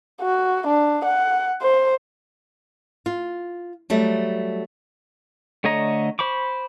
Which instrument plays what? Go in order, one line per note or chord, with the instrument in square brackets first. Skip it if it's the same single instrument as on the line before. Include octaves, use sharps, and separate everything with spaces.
[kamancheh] F#4
D4
F#5
C5
[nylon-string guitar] F4
F#3 G3 A3
[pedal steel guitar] D3 A3 C#5 D#5 A#5
C5 B5 C#6 D6